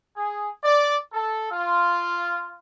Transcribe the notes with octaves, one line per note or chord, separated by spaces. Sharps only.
G#4
D5
A4
F4